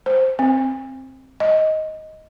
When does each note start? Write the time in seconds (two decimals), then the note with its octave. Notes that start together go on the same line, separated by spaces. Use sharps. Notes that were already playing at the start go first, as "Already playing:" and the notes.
0.06 C5
0.39 C4
1.40 D#5